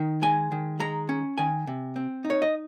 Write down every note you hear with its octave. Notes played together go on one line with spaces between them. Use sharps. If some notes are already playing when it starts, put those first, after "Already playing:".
Already playing: D#3 D#4
G#3 G#5
D#3
G#3 A#5
C#4
D#3 G#5
C3
C4
D#4
C#5
D#5